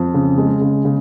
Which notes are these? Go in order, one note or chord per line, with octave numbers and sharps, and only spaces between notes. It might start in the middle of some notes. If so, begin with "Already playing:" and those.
Already playing: F2
C#3
G#3
C#3
C#3